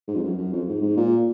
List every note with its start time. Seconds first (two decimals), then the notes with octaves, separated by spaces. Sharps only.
0.08 G#2
0.16 F2
0.24 F#2
0.38 F#2
0.53 F2
0.68 G#2
0.82 G#2
0.97 A#2